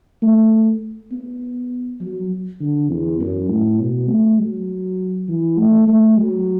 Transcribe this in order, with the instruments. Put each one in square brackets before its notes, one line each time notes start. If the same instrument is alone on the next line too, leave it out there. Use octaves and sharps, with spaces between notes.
[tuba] A3
B3
F#3
D3
E2
F#2
A2
B2
A3
F#3
E3
A3
A3
F#3